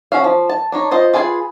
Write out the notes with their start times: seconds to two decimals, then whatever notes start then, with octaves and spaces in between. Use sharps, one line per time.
0.12 C#4 F#4 E5 F5
0.24 F3
0.49 A5
0.72 D4 D#4 C#5
0.91 F4 C5 D#5
1.13 F4 G#4 B4 F#5 G#5